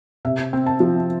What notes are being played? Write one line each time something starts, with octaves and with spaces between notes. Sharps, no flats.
C3 E5
C4
A5
F3